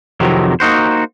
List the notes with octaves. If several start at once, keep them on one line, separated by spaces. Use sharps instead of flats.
F2 C3 D#3 F#3
A#3 D#4 F#4 C5